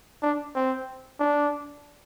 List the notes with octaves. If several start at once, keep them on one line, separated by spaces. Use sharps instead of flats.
D4
C4
D4